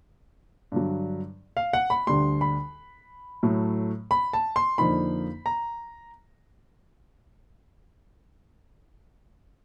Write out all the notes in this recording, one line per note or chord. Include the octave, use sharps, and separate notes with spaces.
G2 D3 F#3
F5
F#5
B5
D2 D3 G3 C6
B5
A2 F#3 A3
B5
A5
C6
F2 D3 F3 A#3 D#4 B5
A#5